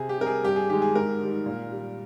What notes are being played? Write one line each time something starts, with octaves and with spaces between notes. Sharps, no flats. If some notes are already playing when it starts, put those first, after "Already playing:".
Already playing: C3 G#4
G4
G3 A#4
G#4
G2 G4
G#4
D#3 G#3 G4
G#4
G#2 A#4
D#3 G3
A#2
G3